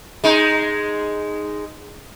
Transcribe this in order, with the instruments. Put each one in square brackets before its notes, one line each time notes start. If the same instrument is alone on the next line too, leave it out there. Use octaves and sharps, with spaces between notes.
[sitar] G#3 D#4